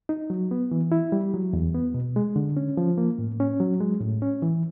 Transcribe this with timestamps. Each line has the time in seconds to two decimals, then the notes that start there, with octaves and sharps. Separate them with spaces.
0.09 D#4
0.30 F#3
0.51 B3
0.71 E3
0.92 E4
1.12 G3
1.34 F#3
1.53 E2
1.74 B3
1.94 B2
2.16 G#3
2.36 D3
2.57 C#4
2.77 F3
2.98 A#3
3.19 A2
3.40 C#4
3.60 F#3
3.80 G#3
4.01 A2
4.22 C#4
4.42 E3